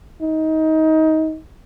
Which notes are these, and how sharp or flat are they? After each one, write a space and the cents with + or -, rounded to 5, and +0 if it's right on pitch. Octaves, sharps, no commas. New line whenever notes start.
D#4 +20